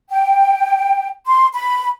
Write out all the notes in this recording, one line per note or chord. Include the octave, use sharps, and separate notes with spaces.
G5
C6
B5